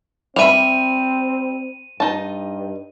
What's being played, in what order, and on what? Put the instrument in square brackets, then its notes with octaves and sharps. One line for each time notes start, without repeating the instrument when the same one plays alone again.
[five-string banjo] G3 E5 B5 [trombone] C4 [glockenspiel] D#7 F7
[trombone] G2 [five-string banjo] D#4 A5